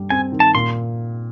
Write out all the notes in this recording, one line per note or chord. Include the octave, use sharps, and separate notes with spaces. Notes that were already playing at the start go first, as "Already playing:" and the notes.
Already playing: G2 G3
C4 G#5
D#3
A5
A#2 C6